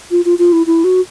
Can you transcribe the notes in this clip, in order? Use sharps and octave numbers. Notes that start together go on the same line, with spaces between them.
F4
F4
F4
E4
E4
F#4